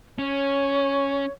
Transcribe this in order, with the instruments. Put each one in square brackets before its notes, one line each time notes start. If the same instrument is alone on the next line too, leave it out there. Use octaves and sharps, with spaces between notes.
[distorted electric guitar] C#4 [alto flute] C#5